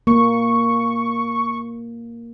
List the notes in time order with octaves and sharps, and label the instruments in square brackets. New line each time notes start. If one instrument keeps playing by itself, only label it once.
[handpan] A#3 [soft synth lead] C#6